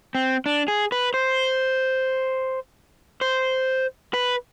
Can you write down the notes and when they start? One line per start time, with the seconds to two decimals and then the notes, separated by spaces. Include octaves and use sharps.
0.15 C4
0.46 D4
0.68 G#4
0.92 B4
1.14 C5
3.21 C5
4.14 B4